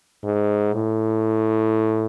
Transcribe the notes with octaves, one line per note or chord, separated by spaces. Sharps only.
G#2
A2